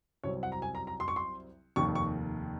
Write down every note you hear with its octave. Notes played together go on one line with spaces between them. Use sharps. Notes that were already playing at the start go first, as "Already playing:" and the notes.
C2 C3 F#3 C4 C#5
F#5
A#5
G#5
A#5
A#5
C6
C#6
C6
F1 D#2 D#3 C#6
C#6